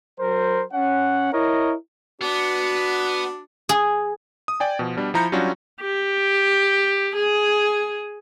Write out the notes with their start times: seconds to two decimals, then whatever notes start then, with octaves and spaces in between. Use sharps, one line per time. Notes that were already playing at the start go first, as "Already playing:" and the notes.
0.19 F#3 A#4 C5
0.73 C#4 F#5
1.33 E4 A#4 C#5 D#5
2.21 B3 D4 F#4
3.69 G#4
4.48 D#6
4.60 D5 G5 G#5
4.79 B2 F3
4.97 B2 G3 D4
5.14 F3 E4 A#5 B5 G6 C#7
5.32 F#3 G3 C#4 D4 F4 F#4
5.81 G4
7.15 G#4